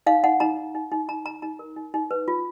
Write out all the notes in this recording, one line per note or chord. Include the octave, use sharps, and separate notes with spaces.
D#4 F5
D#4 F#5
D#4 A#5
D#4
D#4
D#4
D#4 A#5
D#4 A#5
D#4 A#5
A#4
D#4
D#4
B4
F4